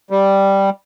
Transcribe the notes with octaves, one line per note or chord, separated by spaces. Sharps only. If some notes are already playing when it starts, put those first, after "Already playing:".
G3